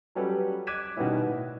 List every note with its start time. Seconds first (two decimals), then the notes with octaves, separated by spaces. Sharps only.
0.15 F#3 G3 C#4 G4 A4 B4
0.67 D6 F#6 G#6 B6 D#7 E7
0.96 B2 D#3 G3 B3 C#4 E4
1.26 A2